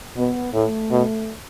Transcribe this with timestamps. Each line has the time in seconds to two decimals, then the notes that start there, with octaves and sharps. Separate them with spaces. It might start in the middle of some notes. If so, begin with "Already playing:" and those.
0.16 B2 B3
0.53 A2 A3
0.91 B2